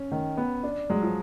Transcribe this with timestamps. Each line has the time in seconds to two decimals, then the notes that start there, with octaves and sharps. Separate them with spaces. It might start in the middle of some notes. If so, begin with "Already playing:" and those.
Already playing: C#4
0.12 D#3
0.37 B3
0.63 D4
0.90 F#3 G#3
1.02 F3